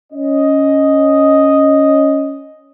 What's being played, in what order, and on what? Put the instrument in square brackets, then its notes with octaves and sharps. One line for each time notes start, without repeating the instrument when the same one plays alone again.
[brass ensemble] C#4 D#5